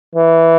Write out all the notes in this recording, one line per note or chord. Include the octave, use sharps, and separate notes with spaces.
E3